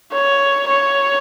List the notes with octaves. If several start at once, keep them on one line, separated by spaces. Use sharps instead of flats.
C#5
C#5